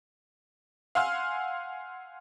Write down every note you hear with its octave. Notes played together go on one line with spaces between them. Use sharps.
F5 F#5 G#5 C6 E6 F6